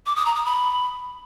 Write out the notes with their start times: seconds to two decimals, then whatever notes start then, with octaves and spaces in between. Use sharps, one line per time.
0.06 D6
0.16 D#6
0.26 A#5
0.35 D#6
0.45 B5